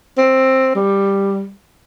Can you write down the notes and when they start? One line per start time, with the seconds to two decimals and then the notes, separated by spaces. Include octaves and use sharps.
0.18 C4
0.75 G3